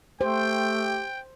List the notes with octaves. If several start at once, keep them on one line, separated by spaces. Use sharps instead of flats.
A3 G4 C5 G5